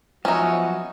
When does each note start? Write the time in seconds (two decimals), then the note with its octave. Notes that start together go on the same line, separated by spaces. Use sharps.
0.25 F3 F#3 B3 C#4 D#4 F#4 E5